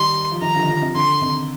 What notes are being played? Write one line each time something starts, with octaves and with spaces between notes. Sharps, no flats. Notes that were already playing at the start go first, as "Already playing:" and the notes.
Already playing: D#3 G3 C6
F3
D#3 G3 A#5
D3 F3
D#3
D3 F3
C3 D#3
D3 C6
C3 D#3